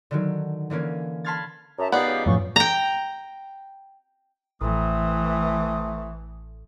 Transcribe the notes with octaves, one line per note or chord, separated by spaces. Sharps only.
D3 D#3 F#3
D3 E3 A#3 C#4
A5 B5 C6 F6 G#6 A6
F#2 E5 A5 A#5
A#2 B3 D#4 G4 D5 F5
C#2
F#2 A2 C#3 F3 C#6
G5 A#5
A1 E3 A3 C4 D#6